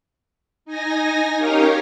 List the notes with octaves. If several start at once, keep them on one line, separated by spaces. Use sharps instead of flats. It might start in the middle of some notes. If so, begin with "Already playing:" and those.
D#4 G#5 A#6
C#4 D#4 G4 A#4 C#5 F5